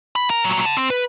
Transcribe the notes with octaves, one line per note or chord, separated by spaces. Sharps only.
B5
A#4
A#2 F#3
F#5 A5
C4
B4